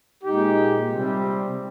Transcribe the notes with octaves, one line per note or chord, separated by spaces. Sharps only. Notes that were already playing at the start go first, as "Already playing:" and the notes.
A#2 G#3 D#4 G4
C3 G3 C4